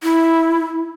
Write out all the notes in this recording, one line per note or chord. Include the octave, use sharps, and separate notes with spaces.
E4